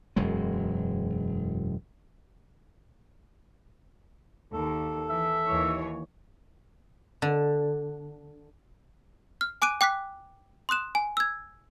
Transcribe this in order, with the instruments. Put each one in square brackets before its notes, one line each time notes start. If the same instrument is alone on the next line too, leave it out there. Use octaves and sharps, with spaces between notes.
[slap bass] E1 F#2 G#3
[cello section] D#2 [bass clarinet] A4
[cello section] E3 [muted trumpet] E5
[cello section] D#2 E3 C#5
[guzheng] D3
[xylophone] F6
G#5 D6 F#6 D7 D#7
G5 D6 F#6 B6
C6 D#6 F#6 E7
G#5
E6 G#6